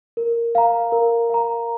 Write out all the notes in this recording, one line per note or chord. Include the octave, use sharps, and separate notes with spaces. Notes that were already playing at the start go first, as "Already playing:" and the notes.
A#4
F5 A#5
A#4
F5 A#5